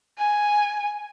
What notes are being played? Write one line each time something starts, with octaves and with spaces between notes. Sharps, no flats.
G#5